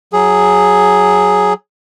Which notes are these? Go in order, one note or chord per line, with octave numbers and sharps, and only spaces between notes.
F#3 G#4